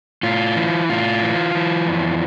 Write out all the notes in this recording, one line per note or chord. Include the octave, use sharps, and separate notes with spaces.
A2 F4
E3
A2 F4
E3
E3
F2